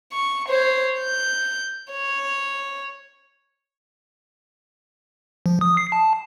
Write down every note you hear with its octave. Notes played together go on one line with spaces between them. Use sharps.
C#6
C5 C#5
G6
C#5
F3
D#6
C7
A5